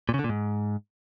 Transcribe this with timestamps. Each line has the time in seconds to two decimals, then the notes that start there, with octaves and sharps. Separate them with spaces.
0.09 A#2
0.14 C#3
0.19 D3
0.24 A#2
0.29 G#2